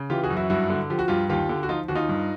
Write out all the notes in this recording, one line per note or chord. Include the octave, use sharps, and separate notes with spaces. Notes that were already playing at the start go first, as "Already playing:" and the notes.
Already playing: C#3
E3 F4 G4
F#4 G#4
F#2
E4 F#4
G2 E4 F#4
D3
F3 G4
F#4
G2 F4 G4
D#2 F4 G4
D3
F#4
F3 D#4 F4
D#2 F#4
D#4 F4
G2